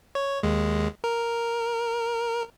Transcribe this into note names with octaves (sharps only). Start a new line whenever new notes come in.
C#5
D#2 G#3
A#4